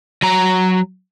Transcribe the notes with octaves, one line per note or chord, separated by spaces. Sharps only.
F#3 A#5